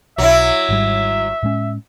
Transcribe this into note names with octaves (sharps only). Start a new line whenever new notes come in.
B1 F#3 E4 E5
G#1 G#2 G3
A2 G#3 C#4